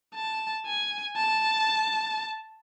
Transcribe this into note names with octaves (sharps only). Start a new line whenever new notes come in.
A5
G#5
A5